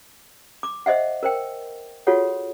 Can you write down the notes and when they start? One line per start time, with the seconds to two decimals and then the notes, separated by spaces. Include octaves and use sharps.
0.63 D6
0.86 C5 D#5 E5 F#5
1.23 A#4 C5 G5
2.07 F4 F#4 G#4 A4 C#5 F#5